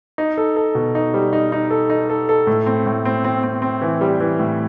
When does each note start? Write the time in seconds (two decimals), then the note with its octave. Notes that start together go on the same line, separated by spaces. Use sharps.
0.18 D#4
0.37 A4
0.56 A4
0.75 B2
0.95 D#4
1.14 G3
1.33 D#4
1.52 D#4
1.71 A4
1.90 D#4
2.10 A4
2.29 A4
2.47 A2
2.66 C4
2.86 A2
3.05 C4
3.24 C4
3.43 C4
3.62 C4
3.81 E3
4.01 G3
4.20 E3
4.39 A2